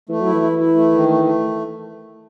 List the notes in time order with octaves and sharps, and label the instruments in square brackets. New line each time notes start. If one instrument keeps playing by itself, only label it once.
[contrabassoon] E3 [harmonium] A3
[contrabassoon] F#3 [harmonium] E4
[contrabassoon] E3
[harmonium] E4
E4
A3
D#3
A3
A3